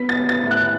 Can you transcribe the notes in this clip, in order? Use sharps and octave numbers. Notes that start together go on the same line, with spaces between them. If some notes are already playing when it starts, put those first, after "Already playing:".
Already playing: B3 B6
A6
B3
A6
A2
F#6